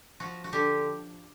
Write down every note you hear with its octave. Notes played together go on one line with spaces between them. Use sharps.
F3 F#4
F#4
D3 G4